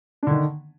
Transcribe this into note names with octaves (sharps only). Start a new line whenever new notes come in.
D3 D#3 D4